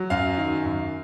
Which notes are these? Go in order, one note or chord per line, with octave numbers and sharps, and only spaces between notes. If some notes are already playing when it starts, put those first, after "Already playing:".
Already playing: F#3
F#2 F5
D#3
F#2